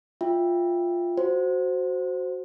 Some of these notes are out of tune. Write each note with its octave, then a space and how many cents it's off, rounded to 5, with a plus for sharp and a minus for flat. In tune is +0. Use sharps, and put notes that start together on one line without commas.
F4 +0 E5 +5 G5 +15
F#4 +0 C5 +0